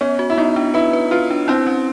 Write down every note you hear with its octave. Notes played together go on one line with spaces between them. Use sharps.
B3 C#4
F#4
E4
B3 D#4
D4
E4 B4
B4
F4 B4
D4
C4 E4
C#4